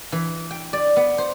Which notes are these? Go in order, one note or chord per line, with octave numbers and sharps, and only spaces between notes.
E3
G5
D5
B3
C5